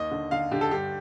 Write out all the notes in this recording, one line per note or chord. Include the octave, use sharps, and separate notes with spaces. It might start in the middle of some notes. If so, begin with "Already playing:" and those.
Already playing: D#2 D#5
D3
D3 F5
D3 G4
A4
G2 G4